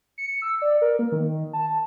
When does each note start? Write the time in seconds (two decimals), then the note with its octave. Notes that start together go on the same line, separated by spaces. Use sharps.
0.18 C#7
0.42 E6
0.62 D5
0.82 A#4
0.99 A#3
1.12 D#3
1.53 A5